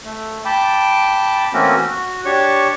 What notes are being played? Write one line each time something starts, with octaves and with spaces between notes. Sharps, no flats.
A3
G5 A5 B5 D6
E3 A3 A#3 C4 C#4 F#4
F#4
D4 G4 C#5 C#6